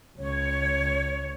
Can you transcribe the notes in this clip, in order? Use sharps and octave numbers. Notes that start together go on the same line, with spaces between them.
C#2 C#5